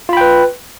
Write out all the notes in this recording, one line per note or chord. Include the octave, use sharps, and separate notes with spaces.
F4 B4 G5 B5